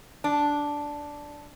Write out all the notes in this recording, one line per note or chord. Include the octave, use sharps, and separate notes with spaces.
D4